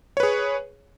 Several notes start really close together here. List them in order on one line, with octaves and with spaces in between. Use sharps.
C#5 B4 G#4